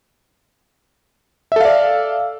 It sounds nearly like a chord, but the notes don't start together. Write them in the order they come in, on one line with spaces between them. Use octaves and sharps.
E5 A4 F5 D5